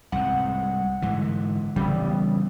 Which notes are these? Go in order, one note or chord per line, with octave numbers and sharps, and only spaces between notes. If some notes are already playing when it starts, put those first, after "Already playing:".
C2 G#2 F#5
G#2 D3 E3
C#3 E3 G3 B3